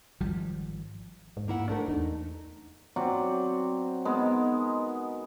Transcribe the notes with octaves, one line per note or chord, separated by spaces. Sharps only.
G#1 F3 G3
G#2
A#3 E4 F#5
G#2 A3 D4 A#4
E2 D#4
F#3 C4 D5 F#5
G#3 B3 D#4 A#4